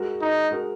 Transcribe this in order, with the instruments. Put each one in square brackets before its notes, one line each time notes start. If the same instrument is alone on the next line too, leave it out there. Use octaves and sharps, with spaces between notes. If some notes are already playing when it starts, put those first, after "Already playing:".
Already playing: [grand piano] G#3 F#4 A#4
[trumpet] D#4
[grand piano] G#3 F#4 A#4